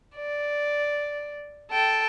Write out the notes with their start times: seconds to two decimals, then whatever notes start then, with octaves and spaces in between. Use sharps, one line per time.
0.16 D5
1.71 A4 G5